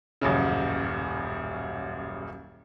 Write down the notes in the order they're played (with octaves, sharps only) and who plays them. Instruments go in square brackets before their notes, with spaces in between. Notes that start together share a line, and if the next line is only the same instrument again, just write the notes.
[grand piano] D#1 A1 F#2 C#3